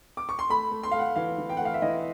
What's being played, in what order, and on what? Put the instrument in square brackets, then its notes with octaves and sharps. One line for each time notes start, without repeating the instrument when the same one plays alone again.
[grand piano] D6
C#6
C6
A3 B5
A3
C6
A3 F5
F#5
E3 F5
E3
G5
A3 F#5
F5
E5
E3 D#5